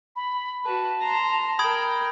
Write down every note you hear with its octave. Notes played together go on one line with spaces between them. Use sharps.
B5
F#4 B4 A5
A#5 C6
A#4 G5 B5 D#6 G#6